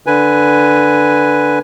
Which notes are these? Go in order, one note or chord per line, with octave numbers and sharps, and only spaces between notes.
D3 B4 G#5